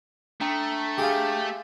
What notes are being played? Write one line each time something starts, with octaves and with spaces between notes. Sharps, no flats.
A3 D4 G5 A#5
F4 G4 G#4